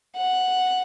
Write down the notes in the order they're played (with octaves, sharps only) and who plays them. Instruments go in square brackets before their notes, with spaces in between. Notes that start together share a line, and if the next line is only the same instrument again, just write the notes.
[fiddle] F#5